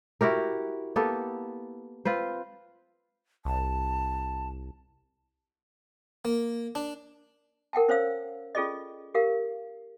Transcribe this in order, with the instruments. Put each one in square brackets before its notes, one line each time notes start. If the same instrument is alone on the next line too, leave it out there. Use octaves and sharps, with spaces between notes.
[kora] E4 F#4 G4 A#4
A#3 B3 G4 A4
C4 F4 B4 C5
[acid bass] C2 [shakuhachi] A5
[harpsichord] A#3
D4
[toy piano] A#4 F#5 G5 A5
C#4 C5 C#5 F5 E6
C#4 F4 G#4 A4 D5 D#5
G4 A#4 F5